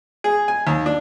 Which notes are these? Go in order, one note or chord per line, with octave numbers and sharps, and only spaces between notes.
G#4
G#5
D#2
D4